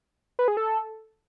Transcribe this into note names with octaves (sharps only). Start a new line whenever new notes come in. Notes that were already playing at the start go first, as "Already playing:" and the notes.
B4
G#4
A4